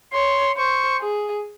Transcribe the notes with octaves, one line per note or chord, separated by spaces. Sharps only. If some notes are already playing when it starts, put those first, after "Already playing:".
C#5 C6
C5 C#6
G#4